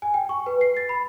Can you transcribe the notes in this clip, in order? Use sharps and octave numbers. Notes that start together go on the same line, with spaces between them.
G#5
G5
C#6
B4
C7
A6
B5